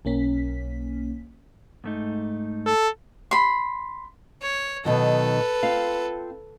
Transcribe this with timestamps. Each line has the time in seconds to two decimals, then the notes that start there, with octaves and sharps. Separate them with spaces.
0.05 B1 A#3 C#4 B6
1.84 G#2 A3 D#4
2.66 A4
3.31 B5 C6
4.42 C#5
4.85 B2 D#3 F#3 A4 B4
5.63 C4 F4 F5